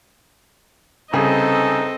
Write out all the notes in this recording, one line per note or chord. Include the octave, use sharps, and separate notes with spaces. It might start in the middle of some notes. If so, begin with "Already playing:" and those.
C2 C#3 C4 D#4 G#4 A4 B4 D#5